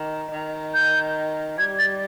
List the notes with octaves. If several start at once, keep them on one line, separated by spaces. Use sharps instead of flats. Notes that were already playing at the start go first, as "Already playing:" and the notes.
Already playing: D#3
D#3
G6
G3 G#6
A6